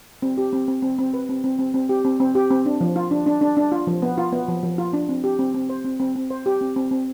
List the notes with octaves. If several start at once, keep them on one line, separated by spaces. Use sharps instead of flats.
C4
G4
C4
C4
C4
C4
B4
C4
C4
C4
C4
G4
C4
C4
G4
C4
D4
F3
F4
D4
D4
D4
D4
F4
F3
B3
F4
B3
F3
F3
F4
D4
C4
G4
C4
C4
C5
C4
C4
C4
C5
G4
C4
C4
C4